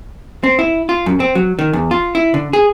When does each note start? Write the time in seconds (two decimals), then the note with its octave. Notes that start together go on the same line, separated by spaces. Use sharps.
0.44 C4
0.59 E4
0.89 F4
1.06 F#2
1.20 C4
1.35 F#3
1.59 D#3
1.73 E2
1.91 F4
2.15 E4
2.34 D3
2.53 G#4